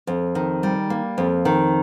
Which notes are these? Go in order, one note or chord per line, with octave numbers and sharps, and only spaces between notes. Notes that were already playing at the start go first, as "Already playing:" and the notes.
F2
D#3
G3
A#3
F2
D#3